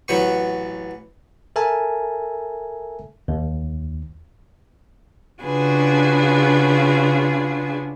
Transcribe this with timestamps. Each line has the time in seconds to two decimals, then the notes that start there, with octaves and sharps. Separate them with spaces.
0.08 A1 F#3 B3 C#6
1.56 A4 A#4 E5 G#5 A5
3.28 D#2
5.43 C#3 D4 F4 F#4 G#4 B4